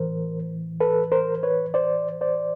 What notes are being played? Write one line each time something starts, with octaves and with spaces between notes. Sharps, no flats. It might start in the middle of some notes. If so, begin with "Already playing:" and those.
Already playing: A2 E3 A#4 C5
A4 B4
A#4 C5
B4 C#5
C5 D5
C5 D5